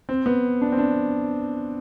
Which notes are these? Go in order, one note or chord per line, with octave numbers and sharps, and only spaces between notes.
C4
B3
D4
C4
D4